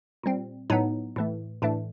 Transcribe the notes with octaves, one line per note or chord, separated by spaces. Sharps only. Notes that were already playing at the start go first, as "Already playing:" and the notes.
A#2 G3 C4
A2 F#3 B3 D#4
A2 E3 A3
A2 E3 A3 D4